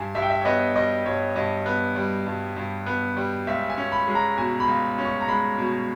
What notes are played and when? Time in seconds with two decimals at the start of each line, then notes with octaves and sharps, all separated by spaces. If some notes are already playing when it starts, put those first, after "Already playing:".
Already playing: G2 G#5
0.15 G2 E5
0.22 G5
0.30 E5
0.41 C#5
0.45 B3 D#5
0.75 G3 D#5
1.06 G2 C#5
1.36 G2 D#5
1.66 B3
1.96 G3
2.26 G2
2.57 G2
2.86 B3
3.17 G3
3.47 C#2 E5
3.70 G#5
3.77 C#4
3.92 B5
4.07 G#3
4.15 A#5
4.37 B2 G#5
4.60 B5
4.68 C#2
4.98 C#4
5.06 C#6
5.21 A#5
5.28 G#3 B5
5.58 B2